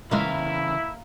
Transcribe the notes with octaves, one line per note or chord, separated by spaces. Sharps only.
A#2 C#3 E3 G#3 A#3 E4 E5 F5